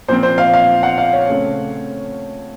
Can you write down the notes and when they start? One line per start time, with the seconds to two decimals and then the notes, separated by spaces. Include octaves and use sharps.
0.08 A#2 F3 C4 C5
0.23 C5
0.38 F5
0.54 F5
0.83 F#5
0.98 F5
1.13 C#5
1.29 C#3 A3 C4